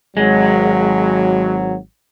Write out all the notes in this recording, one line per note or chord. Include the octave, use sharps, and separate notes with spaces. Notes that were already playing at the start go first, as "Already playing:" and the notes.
G#1 F#3 G#3